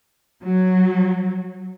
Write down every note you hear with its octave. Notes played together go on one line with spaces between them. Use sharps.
F#3